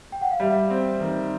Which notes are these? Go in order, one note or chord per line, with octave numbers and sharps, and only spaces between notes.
G5
F#5
F5
G3 E5
C4
D#3